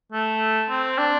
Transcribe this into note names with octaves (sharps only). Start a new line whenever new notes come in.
A3
C4
D4